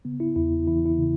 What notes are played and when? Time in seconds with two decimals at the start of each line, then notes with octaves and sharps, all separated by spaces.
0.05 C#3 B3
0.20 E4
0.36 E2 E4
0.68 E3 E4
0.86 E4
0.98 C#3